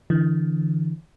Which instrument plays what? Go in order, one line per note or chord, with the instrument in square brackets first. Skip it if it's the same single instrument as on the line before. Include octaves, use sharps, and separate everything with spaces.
[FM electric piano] D3 E3